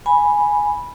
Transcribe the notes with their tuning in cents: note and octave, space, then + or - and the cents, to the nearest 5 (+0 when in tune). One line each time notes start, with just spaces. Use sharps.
G#5 +0 B5 -10